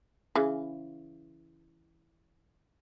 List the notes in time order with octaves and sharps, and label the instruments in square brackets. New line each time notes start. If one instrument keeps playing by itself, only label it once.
[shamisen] C#3 E3